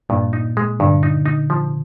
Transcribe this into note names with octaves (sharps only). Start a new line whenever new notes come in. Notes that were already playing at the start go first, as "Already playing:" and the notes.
G2 A#2
D#4
G#3
G2 D3
D#4
D#4
F3